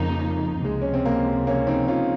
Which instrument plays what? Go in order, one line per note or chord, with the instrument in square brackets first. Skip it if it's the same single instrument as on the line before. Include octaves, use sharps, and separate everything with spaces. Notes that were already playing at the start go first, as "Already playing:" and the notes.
Already playing: [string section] F2 C#3 F3 A#3 D#4
[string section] C#2 C3 F3 [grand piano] G#3
[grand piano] C#4
C4
A#3
A#3 C#4
C4 D#4
C#4 F4